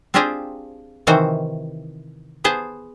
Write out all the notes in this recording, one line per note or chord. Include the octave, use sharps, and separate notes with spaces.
C4 D4 F4 G4 G#4 C5
C3 D#3 E3 F#4 C5
B3 G#4 C5 A5